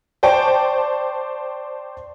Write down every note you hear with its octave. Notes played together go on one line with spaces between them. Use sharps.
C5 D5 G5 A5 C#6